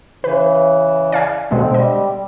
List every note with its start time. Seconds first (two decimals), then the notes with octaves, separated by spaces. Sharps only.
0.24 C#3 E3 B4
1.12 D5 F5 G#5
1.51 B2 D3 G#3 B3 C4
1.74 G3 D#5